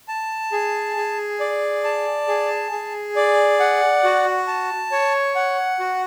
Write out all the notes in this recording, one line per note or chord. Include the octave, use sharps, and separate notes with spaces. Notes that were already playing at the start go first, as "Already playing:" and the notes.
A5
G#4
G#4
D5
A5
G#4
G#4
D5
F#5
F#4
A5
C#5
F#5
F#4